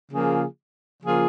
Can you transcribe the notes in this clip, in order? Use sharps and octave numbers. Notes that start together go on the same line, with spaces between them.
C#3 F3 A#3 F4 G#4
C#3 F3 A#3 F4 G#4